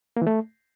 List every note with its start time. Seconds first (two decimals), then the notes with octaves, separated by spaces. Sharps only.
0.17 A#3
0.22 E3
0.27 A3